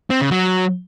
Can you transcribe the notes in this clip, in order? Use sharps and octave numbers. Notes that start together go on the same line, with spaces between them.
C4
C#3
F#3